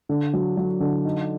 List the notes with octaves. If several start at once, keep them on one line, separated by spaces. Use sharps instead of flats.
D3
F#3
F#3
D3
D#4